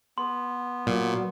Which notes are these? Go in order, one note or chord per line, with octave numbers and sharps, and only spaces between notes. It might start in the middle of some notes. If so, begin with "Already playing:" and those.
B3 C6
A#2 F#3